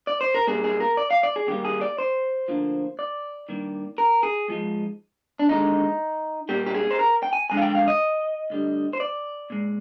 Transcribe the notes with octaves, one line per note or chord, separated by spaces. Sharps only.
D5
C5
A#4
A#2 G3 A#3 G#4
G#4
A#4
D5
F5
D5
G#4
D#2 D#3 G3 A#3 G4
G#4
D5
C5
D2 D3 F3 A#3
D5
G2 D#3 A#3
A#4
G#4
G#2 F3 G#3
D4
D#2 D3 G#3 D#4
A#2 G3 A#3 G4
G4
G#4
C5
A#4
G5
G#5
F2 D3 G#3 G#5
F5
G5
F5
D#5
D2 D3 G3
C5
D5
A#2 G#3